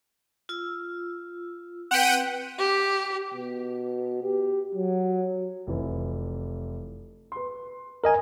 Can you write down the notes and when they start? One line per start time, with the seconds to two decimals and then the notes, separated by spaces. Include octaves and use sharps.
0.49 F4 E6
1.91 C4 B4 F#5 G5 D#7
2.57 G4
3.34 B2
4.24 G4
4.75 F#3
5.67 F1 E3
7.32 B4 C6
8.04 A#4 D#5 G#5